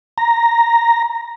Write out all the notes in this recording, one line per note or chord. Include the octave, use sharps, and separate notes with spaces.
A#5